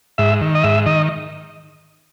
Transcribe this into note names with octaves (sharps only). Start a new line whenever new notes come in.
G#2 E5
D#3
D#5
G#2 E5
D#3 D#5